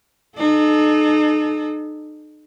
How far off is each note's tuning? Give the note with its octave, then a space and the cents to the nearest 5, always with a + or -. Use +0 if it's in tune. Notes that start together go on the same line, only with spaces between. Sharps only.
D#4 -35 A4 -35